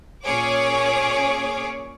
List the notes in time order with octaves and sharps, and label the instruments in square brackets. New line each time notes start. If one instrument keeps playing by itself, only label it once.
[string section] A#2 C#4 G#4 C#5 D6